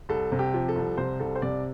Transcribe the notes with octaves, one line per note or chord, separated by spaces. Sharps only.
C2 A4
C3
G4
F3
A4
C2
C3 C5
C2 A4
C5
C3 D5